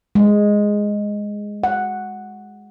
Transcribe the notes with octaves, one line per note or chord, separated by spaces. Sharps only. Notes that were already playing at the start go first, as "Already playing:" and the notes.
G#3
F#5